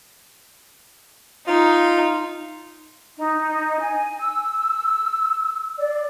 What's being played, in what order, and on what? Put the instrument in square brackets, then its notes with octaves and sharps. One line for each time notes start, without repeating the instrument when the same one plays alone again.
[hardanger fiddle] D#4 [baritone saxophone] F4
[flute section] D#4
G#5
E6
D5